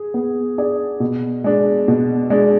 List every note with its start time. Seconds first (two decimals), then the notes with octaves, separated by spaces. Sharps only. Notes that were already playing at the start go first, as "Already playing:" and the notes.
Already playing: G#4
0.14 B3
0.58 D4 G#4 D5
1.00 B2
1.44 G#3 D4
1.88 B2
2.30 G#3 D4